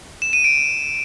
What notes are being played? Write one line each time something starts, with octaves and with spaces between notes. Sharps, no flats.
E7
D#7
D7